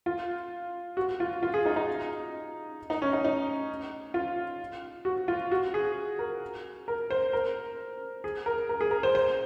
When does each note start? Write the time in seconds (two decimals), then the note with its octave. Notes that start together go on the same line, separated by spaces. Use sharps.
0.06 F4
0.97 F#4
1.20 F4
1.43 F4
1.54 G#4
1.65 D#4
1.76 D#4
2.90 D#4
3.02 C#4
3.13 D#4
3.24 D#4
4.14 F4
5.05 F#4
5.28 F4
5.52 F#4
5.74 G#4
6.19 A#4
6.88 A#4
7.10 C5
7.33 A#4
8.24 G#4
8.46 A#4
8.69 A#4
8.81 G#4
8.91 A#4
9.03 C5
9.15 C5